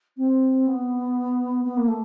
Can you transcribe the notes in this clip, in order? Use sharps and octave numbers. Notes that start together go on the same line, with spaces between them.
C4
B3
B3
A#3
A3